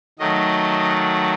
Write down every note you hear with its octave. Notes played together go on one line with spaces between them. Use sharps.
D#3 F#3 A3 D#5
F#5